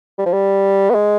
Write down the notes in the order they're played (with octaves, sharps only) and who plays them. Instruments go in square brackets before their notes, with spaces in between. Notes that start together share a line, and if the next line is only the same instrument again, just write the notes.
[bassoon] G3
F3
G3
B3
G#3